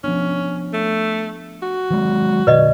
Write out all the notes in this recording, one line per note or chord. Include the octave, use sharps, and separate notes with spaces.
F3 B3 C#4 D4
A3
F#4
D#3 F#3 G#3
A#2 D3 B4 D5 D#5